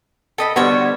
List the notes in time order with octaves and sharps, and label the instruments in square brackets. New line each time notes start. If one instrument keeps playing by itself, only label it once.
[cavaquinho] A4 D#5 B5 [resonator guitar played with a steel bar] G5
[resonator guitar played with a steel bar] D3 G3 B3 [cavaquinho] F#4 C5 C#5